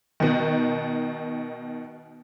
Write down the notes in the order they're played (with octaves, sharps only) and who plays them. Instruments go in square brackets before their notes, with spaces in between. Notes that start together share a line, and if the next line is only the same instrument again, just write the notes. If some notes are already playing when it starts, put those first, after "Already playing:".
[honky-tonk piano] B2 D#3